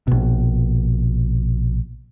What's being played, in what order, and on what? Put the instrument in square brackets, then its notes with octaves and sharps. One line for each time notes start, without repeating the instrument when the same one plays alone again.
[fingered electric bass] A#1 B2